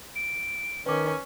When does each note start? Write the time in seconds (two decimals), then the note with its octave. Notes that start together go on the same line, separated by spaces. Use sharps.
0.16 D7
0.86 D#3 C#4 B4 D6